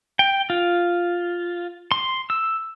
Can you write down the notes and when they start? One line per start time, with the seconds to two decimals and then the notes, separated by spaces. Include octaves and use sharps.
0.19 G5
0.50 F4
1.92 C6
2.30 E6